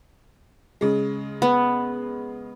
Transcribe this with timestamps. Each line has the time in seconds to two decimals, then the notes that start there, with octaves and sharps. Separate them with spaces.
0.81 C#3 G#3
1.42 B3